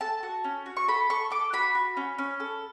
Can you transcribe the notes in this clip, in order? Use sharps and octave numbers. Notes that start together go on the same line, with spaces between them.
A4 A5
F#4
C#4
F#4
C#6
A4 B5
A4 C#6
A4 D6
F#4 B5
F#4
C#4
C#4
A4